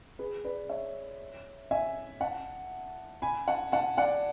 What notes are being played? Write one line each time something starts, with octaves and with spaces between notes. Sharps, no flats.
G#4 B4
B4 D5
C#5 E5
E5 G#5
F#5 A5
G#5 B5
F#5 A5
F#5 A5
D5 F#5